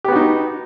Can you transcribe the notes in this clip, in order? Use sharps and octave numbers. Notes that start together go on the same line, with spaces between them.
B3 D#4 F#4 G4